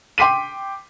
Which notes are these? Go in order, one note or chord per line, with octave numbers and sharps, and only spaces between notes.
G5 C6 D6 B6 C7 D#7